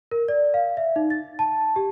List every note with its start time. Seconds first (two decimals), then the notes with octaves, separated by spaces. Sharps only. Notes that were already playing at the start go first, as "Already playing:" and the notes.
0.11 A#4
0.28 D5
0.54 F5
0.77 E5
0.96 D#4
1.10 A6
1.39 A5
1.76 G4